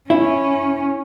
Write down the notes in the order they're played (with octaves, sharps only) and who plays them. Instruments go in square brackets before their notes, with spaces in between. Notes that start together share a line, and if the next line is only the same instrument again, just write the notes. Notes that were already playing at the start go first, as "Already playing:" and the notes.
[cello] C#4 [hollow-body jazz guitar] E4